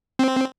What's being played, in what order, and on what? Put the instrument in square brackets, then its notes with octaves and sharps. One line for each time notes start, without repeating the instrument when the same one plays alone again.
[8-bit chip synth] C4